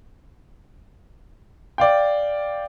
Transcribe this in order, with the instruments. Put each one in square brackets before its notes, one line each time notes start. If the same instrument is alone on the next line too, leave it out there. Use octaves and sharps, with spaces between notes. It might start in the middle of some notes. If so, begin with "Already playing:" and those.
[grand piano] D5 F5 G5